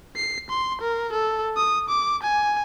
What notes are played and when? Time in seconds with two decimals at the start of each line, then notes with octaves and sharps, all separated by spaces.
0.16 C7
0.50 C6
0.81 A#4
1.12 A4
1.56 D#6
1.89 D6
2.22 G#5